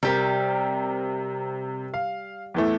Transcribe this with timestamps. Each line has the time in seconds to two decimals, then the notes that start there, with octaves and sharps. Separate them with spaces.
0.03 C3 G3 G4 A#4
1.94 F5
2.54 E2 E3 A3